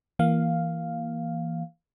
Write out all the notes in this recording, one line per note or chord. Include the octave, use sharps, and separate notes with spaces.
E3 A#3 F5